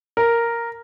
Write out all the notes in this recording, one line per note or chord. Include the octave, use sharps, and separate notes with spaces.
A#4